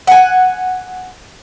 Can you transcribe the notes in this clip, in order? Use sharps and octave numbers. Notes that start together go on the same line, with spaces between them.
F#5 G#5